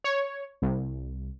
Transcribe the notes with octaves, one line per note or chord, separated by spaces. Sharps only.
C#5
C2